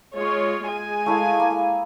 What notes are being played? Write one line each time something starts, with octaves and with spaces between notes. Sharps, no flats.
G#3 F4 C#5
G#3 G#5
A3 E4 F5
A#3